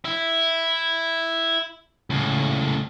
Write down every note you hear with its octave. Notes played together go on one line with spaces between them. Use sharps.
E4
C#2 A2